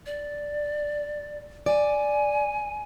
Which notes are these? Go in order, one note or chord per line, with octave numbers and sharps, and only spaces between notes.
D5
D5 G#5